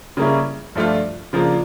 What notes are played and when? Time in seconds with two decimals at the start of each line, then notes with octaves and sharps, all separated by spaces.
0.17 C#3 G3 A#3 C#4 E4
0.75 G2 F3 A3 D4 F4
1.33 C#3 F3 A#3 D4 F4